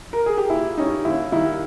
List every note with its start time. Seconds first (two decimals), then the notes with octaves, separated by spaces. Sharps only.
0.13 A#4
0.26 G#4
0.37 G4
0.49 A#2 E4
0.77 G3 C#4 D#4
1.05 D#2 E4
1.32 D#3 G3 E4